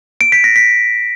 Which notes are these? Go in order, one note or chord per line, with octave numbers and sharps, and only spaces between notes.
D7
B6
A#6
B6